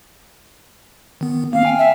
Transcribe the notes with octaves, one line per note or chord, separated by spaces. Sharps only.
D#3 B3
A#3 C4 F5
G5 G#5
E5